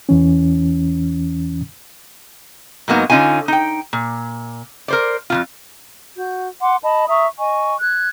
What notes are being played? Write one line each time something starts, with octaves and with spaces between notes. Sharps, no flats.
E2 E3 C#4
G#2 F#3 A#3 B3 D#4
D3 C#4 D#4 F4 G#5
D#4 G5
A#2
A#4 C5 D5
F2 C3 F4
F#4 G6
F#5 C6 D6
D#5 A5 B5
E5 A#5 C#6 D#6
D#5 G#5 C#6
F#6 G#6